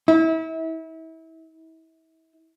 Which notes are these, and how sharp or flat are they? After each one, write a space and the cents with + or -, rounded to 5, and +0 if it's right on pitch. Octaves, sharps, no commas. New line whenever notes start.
E4 -35